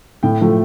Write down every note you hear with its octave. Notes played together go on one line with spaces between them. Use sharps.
A2 G5
F3 A3